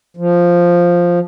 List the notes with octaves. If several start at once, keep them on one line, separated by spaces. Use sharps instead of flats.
F3